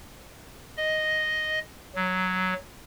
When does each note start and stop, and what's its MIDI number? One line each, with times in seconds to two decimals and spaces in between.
0.77 1.59 75
1.95 2.54 54